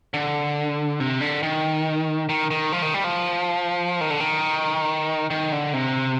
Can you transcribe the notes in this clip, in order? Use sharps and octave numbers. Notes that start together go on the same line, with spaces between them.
D3
C3
D3
D#3
D#3
D#3
F3
D#3
G3
F3
D#3
D3
D#3
D#3
D3
C3